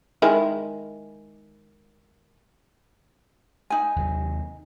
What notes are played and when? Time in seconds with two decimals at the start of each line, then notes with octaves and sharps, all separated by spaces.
0.22 D#3 G#3 E4
3.70 D#4 G#5
3.96 D#2 C3 F#3